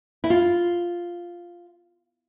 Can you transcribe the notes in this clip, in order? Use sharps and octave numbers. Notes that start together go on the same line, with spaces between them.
E4
F4